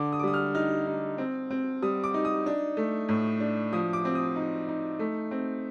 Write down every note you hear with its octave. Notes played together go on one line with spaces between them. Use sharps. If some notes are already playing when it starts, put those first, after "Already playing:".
Already playing: D3 D6
D#6
D6
G3 D#6
F6
D#4 F6
D#4
C4
C4
G3 D#6
D6
D#4
D#6
D4
A3
A2
D4
F3 D#6
D6
C4
D#6
D#4
D#4
A3
C4